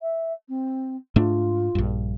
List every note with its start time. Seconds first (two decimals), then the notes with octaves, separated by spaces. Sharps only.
0.01 E5
0.49 C4
1.16 G#2 A3 D4 F4
1.75 A#1 G2